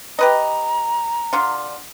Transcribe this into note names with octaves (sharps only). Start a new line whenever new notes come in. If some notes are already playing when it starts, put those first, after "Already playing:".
G4 B4 D#5 A#5
D3 F4